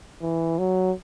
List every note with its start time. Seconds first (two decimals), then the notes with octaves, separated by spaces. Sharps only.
0.22 E3
0.59 F#3